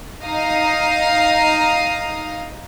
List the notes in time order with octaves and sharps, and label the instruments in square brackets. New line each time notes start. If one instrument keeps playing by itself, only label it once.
[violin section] D#4 F5 A#5 D#6